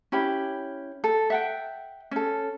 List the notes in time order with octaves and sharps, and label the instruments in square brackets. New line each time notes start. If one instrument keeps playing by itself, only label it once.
[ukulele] C#4 E4 G4 B5
A4
E5 F#5 G5
C#4 A4